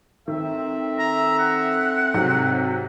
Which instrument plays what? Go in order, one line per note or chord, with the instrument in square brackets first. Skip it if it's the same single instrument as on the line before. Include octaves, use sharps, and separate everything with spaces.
[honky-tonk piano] D#3 [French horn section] C4 A4 [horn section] E5
[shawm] A#5
F#5
[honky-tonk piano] G#2 C3 F#3